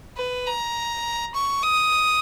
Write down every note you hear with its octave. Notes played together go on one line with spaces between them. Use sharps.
B4
A#5
C#6
D#6